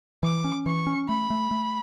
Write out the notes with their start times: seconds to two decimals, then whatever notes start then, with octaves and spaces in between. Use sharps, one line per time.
0.23 E3 D6
0.44 C#4
0.66 E3 C#6
0.87 C#4
1.08 A3 B5
1.30 A3
1.51 A3